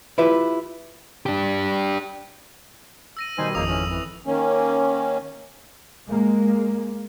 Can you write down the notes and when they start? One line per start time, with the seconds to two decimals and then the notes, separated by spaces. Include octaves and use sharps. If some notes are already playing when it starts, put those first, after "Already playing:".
0.18 E4 F4 G4 B4 E5
1.26 D4 G4
3.17 E6 A#6 D#7
3.38 B2 D#3 G3 D#4 C5 G#5
3.55 G#1 F2 C#3 A#3 D#4 D#6 E6 F7
3.68 E3 C#4
3.90 E3
4.26 D#3 A#3 C#4
6.09 G#3 A#3